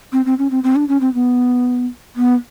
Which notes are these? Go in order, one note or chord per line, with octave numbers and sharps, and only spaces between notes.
C4
C4
C#4
C4
C4
D4
C#4
C4
B3
B3